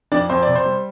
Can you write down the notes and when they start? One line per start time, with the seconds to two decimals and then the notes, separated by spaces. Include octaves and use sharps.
0.12 F2 D4 D5
0.29 F2 C5
0.43 C3 D5
0.56 C5
0.66 G3